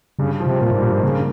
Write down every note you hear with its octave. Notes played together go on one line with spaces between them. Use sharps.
G2 C#3
F3
C3
A#2 A#3
G#2
G2 A#2
G#2
C#3 A#3